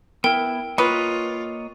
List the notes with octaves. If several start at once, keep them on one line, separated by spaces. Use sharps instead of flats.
B3 E4 A#4 G5
A#3 F4 B4 C#5 D#5